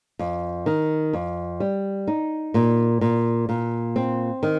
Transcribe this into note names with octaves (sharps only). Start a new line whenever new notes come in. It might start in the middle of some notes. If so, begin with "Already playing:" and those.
F2
D#3
F2
G3
D#4
A#2
A#2
A#2
C4
D#3